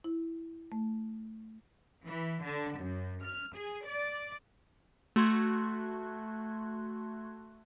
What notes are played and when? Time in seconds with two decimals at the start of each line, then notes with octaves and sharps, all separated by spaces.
0.04 E4
0.72 A3
2.05 E3
2.44 D3
2.79 F#2
3.24 F6
3.56 G#4
3.86 D5
5.16 A3 F#4 C6 F#6 G#6